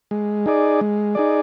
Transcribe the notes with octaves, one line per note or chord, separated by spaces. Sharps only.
G#3
D#4 G#4 D5
G#3
D#4 G#4 D5